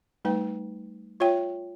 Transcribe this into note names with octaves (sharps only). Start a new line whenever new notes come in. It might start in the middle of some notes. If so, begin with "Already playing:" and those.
G3 A3 D#4 B4 G5
F4 C#5 E5 G5